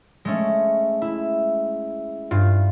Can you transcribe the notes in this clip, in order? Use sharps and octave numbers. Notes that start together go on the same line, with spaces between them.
G#3 A3 C#4
E4
G2 F4